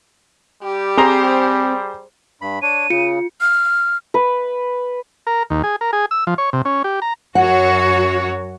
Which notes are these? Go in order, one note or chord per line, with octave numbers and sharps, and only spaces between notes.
G3 G4
C4 G#4 C5 A#5
G2 B5
D4 C#5 D#7
C#3 F4 C#7
F6
B4
A#4
D#2
G#4
A#4
G#4
E6
F3
C#5
C3
C#4
G4
A#5
F#2 F#4 C#5 F#5